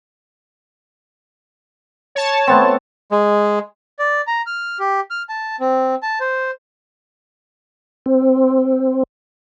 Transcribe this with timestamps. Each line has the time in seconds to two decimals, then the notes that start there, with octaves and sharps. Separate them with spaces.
2.15 C#5 A5
2.47 A3 B3 C4
3.11 G#3
3.99 D5
4.27 A#5
4.47 F6
4.80 G4
5.10 F6
5.29 A5
5.60 C4
6.03 A5
6.20 C5
8.06 C4